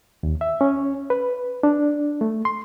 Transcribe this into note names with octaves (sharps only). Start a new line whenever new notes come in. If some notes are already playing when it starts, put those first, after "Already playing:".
D#2
E5
C#4
B4
D4
A3
C6